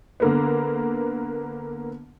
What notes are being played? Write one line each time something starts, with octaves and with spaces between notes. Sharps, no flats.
D3 A#3 B3